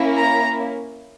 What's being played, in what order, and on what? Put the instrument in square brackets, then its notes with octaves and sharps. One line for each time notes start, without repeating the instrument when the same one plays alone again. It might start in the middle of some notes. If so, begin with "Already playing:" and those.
Already playing: [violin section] A#3 C#4 E4
A#5